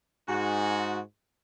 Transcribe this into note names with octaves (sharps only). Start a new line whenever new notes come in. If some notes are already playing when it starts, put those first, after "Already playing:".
G#2 F#4